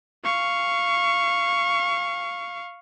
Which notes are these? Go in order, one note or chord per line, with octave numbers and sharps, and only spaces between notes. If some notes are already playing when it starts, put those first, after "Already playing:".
F5 C#6